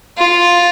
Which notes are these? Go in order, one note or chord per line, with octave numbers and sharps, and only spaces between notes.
F4